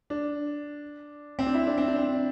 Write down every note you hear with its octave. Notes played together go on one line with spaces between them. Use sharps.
D4
C4
D4
E4
D4
C4
D4
C4